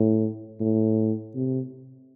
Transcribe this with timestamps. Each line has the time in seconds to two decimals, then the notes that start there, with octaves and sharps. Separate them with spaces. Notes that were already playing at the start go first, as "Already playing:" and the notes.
Already playing: A2
0.60 A2
1.35 C3